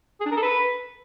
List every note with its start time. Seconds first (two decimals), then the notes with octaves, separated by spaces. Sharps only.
0.20 G#4
0.26 D4
0.31 A#4
0.37 A4
0.42 B4